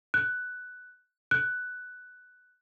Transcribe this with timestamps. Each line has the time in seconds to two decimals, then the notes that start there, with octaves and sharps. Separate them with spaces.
0.14 F#6
1.31 F#6